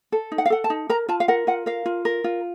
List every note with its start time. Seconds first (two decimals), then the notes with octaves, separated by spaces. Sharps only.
0.12 A4
0.32 D#4
0.38 F#5
0.46 F5
0.50 A4 F#5
0.64 A5
0.70 D#4
0.89 A#4 A#5
1.09 F4 A5
1.20 F5
1.28 A#4 F#5
1.47 F4 F#5
1.66 A#4 F5
1.86 F4
2.05 A#4
2.24 F4